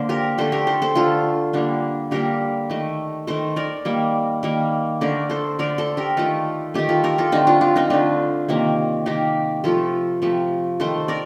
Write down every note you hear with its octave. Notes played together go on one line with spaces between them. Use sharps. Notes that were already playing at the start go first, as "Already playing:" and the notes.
Already playing: D3 A#3 C5 D5
G4 A#4
D3 A3 A4 C5
G4 A#4
A4 C5
A4 C5
D3 A3 F4 A4
D3 G3 A#3 D4
D3 G3 A#3 G4 A#4
D#3 A3
D#3 A3 A4 C5
A#4 D5
D#3 G3 A#3
D#3 G3 A#3
D3 A3 A#4 D5
A4 C5
D3 A3 A#4 D5
A4 C5
G4 A#4
D#3 A3 F4 A4
D#3 A3 D#4 G4
F4 A4
G4 A#4
F4 A4
D3 A3 C4 D#4
D4 F4
D4 F4
C4 D#4
D3 A3 D4 F4
C3 D#3 A#3
C3 D#3 A#3 D#4 G4
C3 F3 A3 F4 A4
C3 F3 A3
D#3 A3 A4 C5
A#4 D5